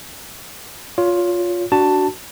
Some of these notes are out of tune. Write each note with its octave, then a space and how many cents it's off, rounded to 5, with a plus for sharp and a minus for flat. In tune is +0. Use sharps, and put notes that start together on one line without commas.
F4 +10 C#5 +25
D4 +0 F#4 +15 A5 +10